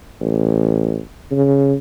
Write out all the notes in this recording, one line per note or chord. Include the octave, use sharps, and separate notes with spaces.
A1
C#3